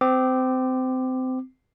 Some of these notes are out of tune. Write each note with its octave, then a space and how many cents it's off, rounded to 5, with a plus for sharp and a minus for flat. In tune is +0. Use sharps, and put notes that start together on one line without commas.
C4 -25 D6 +15